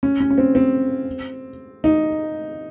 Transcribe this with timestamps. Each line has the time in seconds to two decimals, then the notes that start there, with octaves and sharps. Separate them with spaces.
0.03 C#4
0.20 C#4
0.30 C#4
0.38 C4
0.55 C4
1.84 D#4